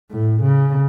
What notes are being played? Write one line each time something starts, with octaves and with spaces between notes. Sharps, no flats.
A2
C#3